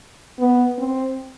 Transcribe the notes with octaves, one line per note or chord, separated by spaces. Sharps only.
B3
C4